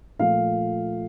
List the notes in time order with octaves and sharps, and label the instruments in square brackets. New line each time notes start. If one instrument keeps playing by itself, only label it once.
[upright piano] A#2 F3 A3 F5